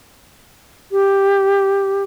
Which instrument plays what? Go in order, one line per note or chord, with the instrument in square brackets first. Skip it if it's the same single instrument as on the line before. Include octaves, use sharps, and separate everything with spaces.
[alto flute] G4